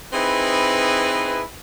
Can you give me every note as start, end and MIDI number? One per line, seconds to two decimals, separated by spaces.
0.13 1.42 60
0.13 1.42 63
0.13 1.42 64
0.13 1.42 68
0.13 1.42 71